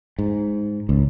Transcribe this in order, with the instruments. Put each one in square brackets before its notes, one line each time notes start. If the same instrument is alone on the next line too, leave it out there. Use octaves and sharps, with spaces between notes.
[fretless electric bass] G#2
C#2